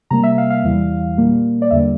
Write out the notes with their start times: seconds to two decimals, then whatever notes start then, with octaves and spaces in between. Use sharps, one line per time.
0.11 C3 G3 A#3 A#5
0.23 E5
0.38 F5
0.50 F5
0.64 E2 E3 G3
1.18 A#2 G3 A#3
1.62 D5
1.71 E2 D3 G3 A#3 E5